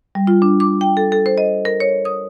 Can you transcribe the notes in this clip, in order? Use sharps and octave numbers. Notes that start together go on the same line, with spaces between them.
G3
F4
D4
D6
G5
A4
A4
C5
D#5
A#4
C#5
D#6